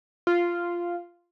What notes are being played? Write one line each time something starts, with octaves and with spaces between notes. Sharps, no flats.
F4